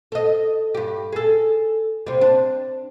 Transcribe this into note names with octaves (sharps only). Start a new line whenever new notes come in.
A4 D#5
G2 G4
G#4 A4
C3 G3
D4